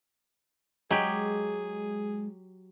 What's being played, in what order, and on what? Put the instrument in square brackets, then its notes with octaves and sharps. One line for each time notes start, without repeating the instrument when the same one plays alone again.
[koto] F#3 G4 [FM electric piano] G#3 [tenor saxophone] G#4